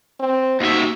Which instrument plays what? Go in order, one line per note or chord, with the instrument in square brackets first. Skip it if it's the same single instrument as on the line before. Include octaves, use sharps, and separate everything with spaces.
[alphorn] C4
[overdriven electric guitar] D#2 E5 [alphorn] F#4